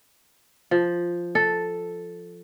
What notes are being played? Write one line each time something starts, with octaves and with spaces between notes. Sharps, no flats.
F3
A4